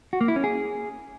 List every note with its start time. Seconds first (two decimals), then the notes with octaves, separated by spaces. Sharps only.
0.13 F#4
0.21 A#3
0.28 E4
0.36 C#4
0.44 G#4